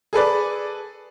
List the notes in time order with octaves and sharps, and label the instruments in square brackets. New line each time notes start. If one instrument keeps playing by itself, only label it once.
[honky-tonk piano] G#4 A4 B4 D5